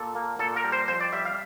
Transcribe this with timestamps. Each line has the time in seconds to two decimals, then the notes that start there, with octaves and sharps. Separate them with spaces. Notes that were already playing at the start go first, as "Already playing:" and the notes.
Already playing: A#2 A4
0.15 A#3
0.39 A#2 A4
0.56 A#4
0.64 G3
0.72 C5
0.88 F2 C5
1.01 D5
1.13 G3 E5
1.25 F5